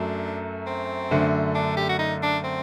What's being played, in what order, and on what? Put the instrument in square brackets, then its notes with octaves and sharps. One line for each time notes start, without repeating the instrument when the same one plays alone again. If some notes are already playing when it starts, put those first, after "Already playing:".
Already playing: [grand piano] F#2 F#3 A3 [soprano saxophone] D4
[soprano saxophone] C4
[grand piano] F#2 D3 A3
[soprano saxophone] D4
G4
F#4
D#4
D4
C4